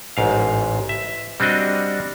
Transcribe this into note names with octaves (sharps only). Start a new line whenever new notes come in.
A1 G#2 F5
E5
G3 C4 D4 F#4 D#5